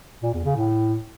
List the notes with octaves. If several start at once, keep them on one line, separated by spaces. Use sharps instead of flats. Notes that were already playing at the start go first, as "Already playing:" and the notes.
A#2
E2
C#3
A2